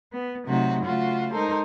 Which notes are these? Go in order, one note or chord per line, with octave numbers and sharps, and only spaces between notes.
B3
C3 F#3 A3 D#4 F#4
C#3 A3 F4 F#4
G#3 D#4 A4 A#4 C5